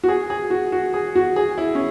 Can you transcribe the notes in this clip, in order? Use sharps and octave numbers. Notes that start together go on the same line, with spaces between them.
F#4
G#4
G#4
F#4
F#4
G#4
F#4
G#4
E4
C#4